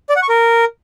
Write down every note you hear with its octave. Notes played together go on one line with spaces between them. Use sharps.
D5
F#5
C#6
A#4